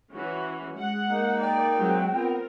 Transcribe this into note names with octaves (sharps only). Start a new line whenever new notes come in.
E3 C#4 F#4
G#3 F#5
A#3 D#4
D5 G5
F#3 G#3 C4
B3 C4 F4 A#4